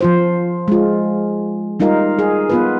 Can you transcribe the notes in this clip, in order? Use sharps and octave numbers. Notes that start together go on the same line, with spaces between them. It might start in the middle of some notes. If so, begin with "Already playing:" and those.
F3 F4 C5
G#3 F4
G3 D#4 F4 A#4 F5
G#4
B3 F4 B4